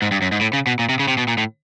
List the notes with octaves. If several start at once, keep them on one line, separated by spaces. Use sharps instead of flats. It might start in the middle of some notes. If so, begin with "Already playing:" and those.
G#2
G2
F#2
G#2
A2
C#3
B2
A#2
C3
C#3
C3
B2
A#2
A2